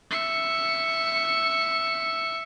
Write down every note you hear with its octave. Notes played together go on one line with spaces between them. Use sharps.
E5 C#7